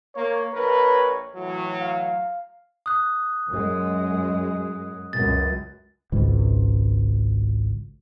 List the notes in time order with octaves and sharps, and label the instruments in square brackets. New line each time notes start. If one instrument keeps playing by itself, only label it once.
[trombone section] A#3 [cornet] C#5
[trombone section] A#1 A#4 B4
A2 E3 F#3
[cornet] F5
[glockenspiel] D#6 F#6
[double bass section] F#2 G#3
[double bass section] C#2 F#2 [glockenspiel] A6
[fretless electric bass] G#1 C#2 G#2